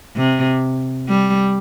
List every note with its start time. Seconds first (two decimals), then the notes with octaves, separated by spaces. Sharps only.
0.16 C3
1.09 G3